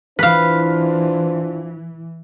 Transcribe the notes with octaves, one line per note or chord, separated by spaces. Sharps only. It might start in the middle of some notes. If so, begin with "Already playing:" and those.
E3 D4 F4 B4 C5 F5